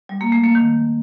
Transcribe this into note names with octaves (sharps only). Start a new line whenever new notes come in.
G3
A#3
A3
A#3
D#3